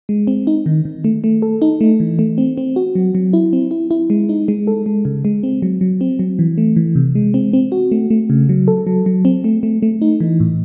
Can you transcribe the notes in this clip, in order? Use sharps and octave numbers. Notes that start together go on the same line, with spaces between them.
G#3
C4
D#4
D#3
D#3
A3
A3
A4
D#4
A3
E3
A3
C4
C4
F#4
F#3
F#3
E4
C4
E4
E4
G#3
D#4
G#3
A4
G#3
C#3
G#3
C4
F#3
F#3
C4
F#3
E3
A3
E3
C3
G#3
C4
C4
F#4
A3
A3
C#3
F#3
A4
F#3
F#3
C4
A3
A3
A3
D#4
E3
A2